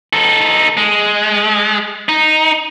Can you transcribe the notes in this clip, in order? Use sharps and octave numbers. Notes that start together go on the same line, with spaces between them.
D#4 A4
G#3
D#4